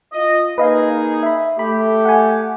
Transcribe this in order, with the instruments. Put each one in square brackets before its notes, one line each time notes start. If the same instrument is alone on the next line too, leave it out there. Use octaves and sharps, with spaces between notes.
[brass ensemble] F4 D#5
[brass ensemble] A#3 D#4 G#4 [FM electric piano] B4 D#5 F5
[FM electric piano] E5 B5
[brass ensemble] A3 G4 [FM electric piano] B5
[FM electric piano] F#5 G#5